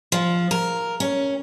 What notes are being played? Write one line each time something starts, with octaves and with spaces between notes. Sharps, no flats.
F3
A#4
C#4